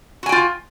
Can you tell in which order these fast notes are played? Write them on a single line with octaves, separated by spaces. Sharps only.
F#4 G#5 G5 F4